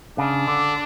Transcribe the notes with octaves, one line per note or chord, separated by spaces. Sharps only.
C#3 D4
D3